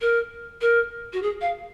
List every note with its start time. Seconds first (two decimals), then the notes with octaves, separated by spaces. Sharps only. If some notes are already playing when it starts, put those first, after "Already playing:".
0.01 A#4
0.61 A#4
1.13 F#4
1.23 G#4
1.41 F5